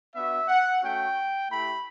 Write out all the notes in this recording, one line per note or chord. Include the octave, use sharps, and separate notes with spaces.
B3 D4 F#4 E5
F#5
A3 C#4 F#4 G5
A3 E4 G4 B5